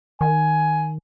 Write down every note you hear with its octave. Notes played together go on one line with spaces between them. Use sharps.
D#3 G#5